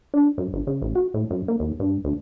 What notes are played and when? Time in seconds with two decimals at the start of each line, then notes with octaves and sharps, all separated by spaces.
0.14 D4
0.38 F#2
0.53 G1
0.67 C#3
0.82 A1
0.95 F#4
1.14 A2
1.31 F#2
1.48 A#3
1.60 D#2
1.80 G2
2.04 D2